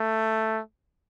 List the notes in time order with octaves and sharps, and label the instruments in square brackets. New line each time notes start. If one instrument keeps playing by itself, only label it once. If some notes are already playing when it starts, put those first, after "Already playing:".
Already playing: [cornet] A3